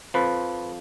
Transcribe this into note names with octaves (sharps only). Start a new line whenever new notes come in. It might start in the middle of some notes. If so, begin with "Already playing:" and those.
F2 F3 B4